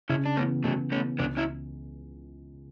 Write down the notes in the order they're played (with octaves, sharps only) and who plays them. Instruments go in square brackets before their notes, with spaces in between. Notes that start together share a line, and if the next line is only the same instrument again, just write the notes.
[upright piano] C#3 [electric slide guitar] C#4 E4
[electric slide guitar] D4
[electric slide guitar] A3 C#4 [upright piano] B3
[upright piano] E3
[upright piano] C#3 [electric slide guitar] F#3 A3
[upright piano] E3 B3 [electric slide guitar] A3 C#4
[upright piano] C#2 [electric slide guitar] B3 D4
[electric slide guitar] C#4 E4